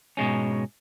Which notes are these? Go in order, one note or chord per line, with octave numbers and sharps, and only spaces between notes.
G#2 B2 G#3 C#4